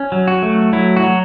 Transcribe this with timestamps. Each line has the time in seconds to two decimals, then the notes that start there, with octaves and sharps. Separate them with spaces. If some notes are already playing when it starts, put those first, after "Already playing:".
Already playing: C#4
0.12 F#3
0.28 F#4
0.42 A3
0.73 F#3 E4
0.97 F#4
1.03 F#3